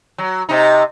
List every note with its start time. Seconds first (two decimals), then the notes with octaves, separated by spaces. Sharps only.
0.18 F#3
0.49 C3 D#4